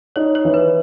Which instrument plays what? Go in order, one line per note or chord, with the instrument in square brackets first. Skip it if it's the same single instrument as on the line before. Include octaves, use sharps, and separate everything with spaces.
[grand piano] D#4 [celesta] C#5
[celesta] C#5
[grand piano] E3
[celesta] B4